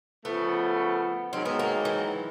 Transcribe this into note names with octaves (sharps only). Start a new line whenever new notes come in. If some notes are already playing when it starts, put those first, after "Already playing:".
C#3 F3 A3 B3
G#2 D#3 F#3 C4
B3
A#3
E3